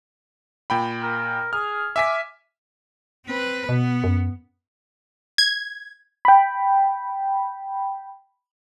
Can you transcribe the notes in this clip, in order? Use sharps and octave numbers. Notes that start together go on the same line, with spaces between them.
A#2 G5 B5
A#4
G#4 F6
E5 G#5 D6 B6
C4 B4
B2 B3
F#2
G#6
G5 B5